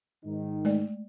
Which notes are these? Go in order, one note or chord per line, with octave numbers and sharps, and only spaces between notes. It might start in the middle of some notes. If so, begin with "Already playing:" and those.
G#2 D#3 D#4
G#3 A3 D5